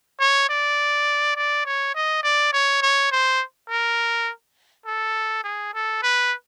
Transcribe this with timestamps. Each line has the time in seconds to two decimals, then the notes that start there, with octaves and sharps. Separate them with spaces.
0.20 C#5
0.49 D5
1.36 D5
1.66 C#5
1.95 D#5
2.23 D5
2.53 C#5
2.82 C#5
3.12 C5
3.70 A#4
4.86 A4
5.44 G#4
5.74 A4
6.03 B4